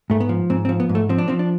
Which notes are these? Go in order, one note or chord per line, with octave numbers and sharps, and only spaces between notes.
G#2 A3
B3
F3
G#2 C4
C4
F3
B3
G#2
A3
F3 C4
D4
F3 C4
D4